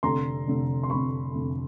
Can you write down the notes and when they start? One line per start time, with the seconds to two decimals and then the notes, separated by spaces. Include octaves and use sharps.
0.03 F1 F2 D3 A#5 C6
0.47 F1 F2 D3
0.83 C6
0.90 F1 F2 D3 B5 C#6
1.33 F1 F2 D3